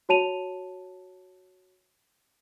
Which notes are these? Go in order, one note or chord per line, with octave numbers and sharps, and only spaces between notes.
F#4 C#5 A5 D#7 F7